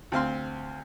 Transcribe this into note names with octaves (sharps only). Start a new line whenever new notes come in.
D2 C4 F5 C6